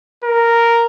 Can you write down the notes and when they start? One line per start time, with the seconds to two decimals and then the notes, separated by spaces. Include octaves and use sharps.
0.24 A#4